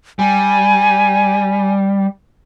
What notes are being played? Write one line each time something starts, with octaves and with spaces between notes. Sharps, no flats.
G3 G#5